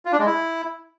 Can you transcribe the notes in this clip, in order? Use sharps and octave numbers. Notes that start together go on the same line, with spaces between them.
F4
D4
G#3
E4